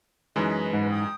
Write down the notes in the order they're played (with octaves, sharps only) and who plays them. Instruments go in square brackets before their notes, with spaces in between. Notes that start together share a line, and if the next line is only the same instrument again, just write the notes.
[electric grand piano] F#2 G#3 [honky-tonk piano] E3 D#4 [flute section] B4 D#5
[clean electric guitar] G#2
[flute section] G5 D#6